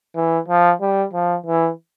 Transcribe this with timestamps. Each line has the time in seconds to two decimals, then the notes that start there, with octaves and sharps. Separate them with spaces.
0.16 E3
0.48 F3
0.81 G3
1.13 F3
1.46 E3